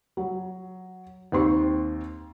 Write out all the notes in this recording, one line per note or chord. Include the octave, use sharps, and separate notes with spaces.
F#3
D#2 C4 G4 C6 C#6